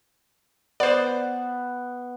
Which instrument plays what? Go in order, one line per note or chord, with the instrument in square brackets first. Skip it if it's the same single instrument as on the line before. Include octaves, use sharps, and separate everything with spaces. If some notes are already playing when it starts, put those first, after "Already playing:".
[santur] B3 [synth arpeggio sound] C5 D5